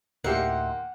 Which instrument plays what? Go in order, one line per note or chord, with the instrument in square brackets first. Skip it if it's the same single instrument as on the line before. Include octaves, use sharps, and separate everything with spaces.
[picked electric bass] D2 A2 [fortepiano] A#3 G4 [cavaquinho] D#4 E5 C6 [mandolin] F#5